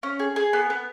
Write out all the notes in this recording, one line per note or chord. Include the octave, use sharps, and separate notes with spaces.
C#4
G#4
G#4
B3
B3